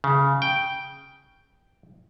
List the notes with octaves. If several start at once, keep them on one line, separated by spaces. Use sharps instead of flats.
C#3
G5